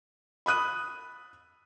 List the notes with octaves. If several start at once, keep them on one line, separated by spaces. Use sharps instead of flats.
B5 D#6 F#6 D#7